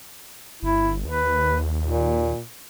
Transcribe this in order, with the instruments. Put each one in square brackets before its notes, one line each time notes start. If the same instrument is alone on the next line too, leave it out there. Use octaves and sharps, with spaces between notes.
[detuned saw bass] G1 [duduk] E4
[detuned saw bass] D#2 [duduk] B4
[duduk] A#2